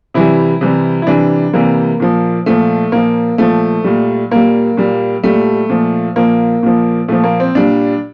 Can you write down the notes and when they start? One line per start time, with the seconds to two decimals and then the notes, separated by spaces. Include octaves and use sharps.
0.14 C3 E3 G3 E4
0.61 C3 E3 G3
1.02 E4
1.07 C3 E3 G3 D4
1.53 C3 E3 G3 A#3
2.00 A#2 F3
2.46 A#2 F3 A3
2.92 A#2 F3 A#3
3.38 A#2 F3 A3
3.84 A#2 G3
4.31 A#2 G3 A#3
4.77 A#2 G3
5.23 A#2 G3 A3
5.69 A#2 F3
6.16 A#2 F3 A#3
6.63 A#2 F3
7.08 A#2 F3 A3
7.24 A#3
7.40 C4
7.55 A#2 G3 D4